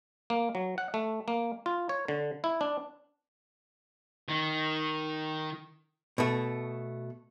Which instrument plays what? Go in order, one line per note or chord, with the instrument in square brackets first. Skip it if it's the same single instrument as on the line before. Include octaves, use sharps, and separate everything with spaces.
[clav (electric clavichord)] A#3
F#3
F#5
A3
A#3
F4
C#5
D3
E4
D4
[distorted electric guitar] D#3
[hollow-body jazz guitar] B2 A3